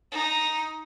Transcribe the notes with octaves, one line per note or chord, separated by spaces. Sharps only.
D#4